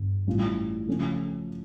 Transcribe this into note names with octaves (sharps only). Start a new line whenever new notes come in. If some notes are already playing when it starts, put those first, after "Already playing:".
Already playing: G1 G2 D3
A1 A2 G3 C#4 F4
C#3 F3 A3 C#4